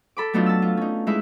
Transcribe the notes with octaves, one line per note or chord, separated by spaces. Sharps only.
A4 B5 D6
F#3 A3 B3 D4 D#4 F4
A5 E6
F4
C#4 D#4
G#3 D#4 E4 B4 E5